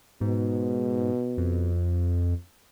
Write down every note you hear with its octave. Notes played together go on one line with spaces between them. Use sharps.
G#2 B2
F2